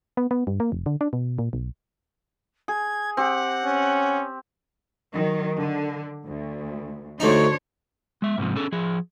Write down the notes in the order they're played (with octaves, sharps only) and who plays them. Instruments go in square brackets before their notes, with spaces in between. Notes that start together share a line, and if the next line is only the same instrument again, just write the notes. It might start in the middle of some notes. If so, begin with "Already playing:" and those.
[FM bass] B3
B3
G2
A#3
F1
D3
D4
B2
A#2
B1
[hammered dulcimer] G#4 [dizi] G#6
[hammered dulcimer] C4 G4 [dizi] F#5
[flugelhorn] C#4
[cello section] D#3 F#3
D3
D2
[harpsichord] D2 D#4 [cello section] D4 C5 C#5
[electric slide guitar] G#3 E5
G#2 C3 E3 F3
C#4 G#4 A4
F3 G#4